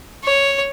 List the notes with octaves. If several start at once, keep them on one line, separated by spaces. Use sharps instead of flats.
C#5